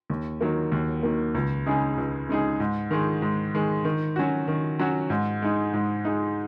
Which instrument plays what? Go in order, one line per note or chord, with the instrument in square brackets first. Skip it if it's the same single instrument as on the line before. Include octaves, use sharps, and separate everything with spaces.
[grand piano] D#2
D#3 F#3 A#3
D#2
D#3 F#3 A#3
C#2
C#3 G#3 D#4 G#4
C#2
C#3 G#3 D#4 G#4
G#2
D#3 G#3
G#2
D#3 G#3
D#3
F#3 C#4 F#4
D#3
F#3 C#4 F#4
G#2
G#3 D#4
G#2
G#3 D#4